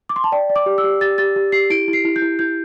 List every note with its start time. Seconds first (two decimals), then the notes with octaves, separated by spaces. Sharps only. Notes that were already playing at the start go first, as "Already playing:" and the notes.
0.09 D6
0.16 C6
0.24 A5
0.32 D5 G5
0.49 D5
0.56 D6
0.66 G4
0.78 E6
0.84 G4
1.01 G4 A6
1.18 G4 A6
1.36 G4
1.52 G4 C7
1.70 E4 D7
1.88 E4
1.93 C7
2.05 E4
2.16 G6
2.22 E4
2.39 E4 G6